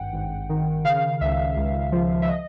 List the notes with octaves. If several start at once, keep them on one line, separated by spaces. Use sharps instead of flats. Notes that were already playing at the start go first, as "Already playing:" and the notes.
Already playing: G#1 G2 F#5 G5
G#1
D#3
C#3 F5
C#2 E5
C#2
F3
E5
D#5